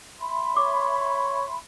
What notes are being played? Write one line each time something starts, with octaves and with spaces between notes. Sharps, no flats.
E5 B5 C6
C#5 D6